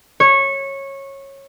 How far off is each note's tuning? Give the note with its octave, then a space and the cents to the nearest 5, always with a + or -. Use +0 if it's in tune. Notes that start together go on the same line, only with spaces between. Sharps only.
C#5 -15